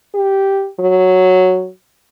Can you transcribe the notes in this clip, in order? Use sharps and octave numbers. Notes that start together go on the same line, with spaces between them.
G4
F#3